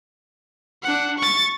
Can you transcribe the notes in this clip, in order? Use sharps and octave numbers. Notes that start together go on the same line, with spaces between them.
D4 F#5
C#6 A6